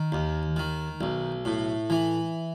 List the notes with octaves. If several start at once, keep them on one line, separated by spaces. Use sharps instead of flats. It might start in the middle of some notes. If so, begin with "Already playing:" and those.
Already playing: D#3
D#2
D#3
B1
A2
E3